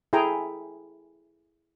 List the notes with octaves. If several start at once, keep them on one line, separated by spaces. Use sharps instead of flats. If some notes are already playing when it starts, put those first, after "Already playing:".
E4 G#4 A4 G5 G#5 A#5